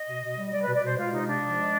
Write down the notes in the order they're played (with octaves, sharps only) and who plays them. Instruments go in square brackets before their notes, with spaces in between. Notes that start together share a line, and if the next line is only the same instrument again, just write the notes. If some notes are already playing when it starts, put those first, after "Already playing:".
Already playing: [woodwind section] D#5
B2
B2
G3
G3 D5
B2 B4
D5
B2 C5
G#3 F4
C3 D#4
C3 D4
F3
G#3